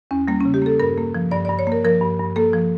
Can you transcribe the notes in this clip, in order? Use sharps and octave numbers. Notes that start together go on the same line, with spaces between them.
E2 C#4
G3 A#3
C#4
C#3
G4
A#3 A4
G2 A#4
A#3
F3
G2 D5
G2 D5
C#5
A#3
A#4
F3 A#4
G2
G2
A#3 A4
F3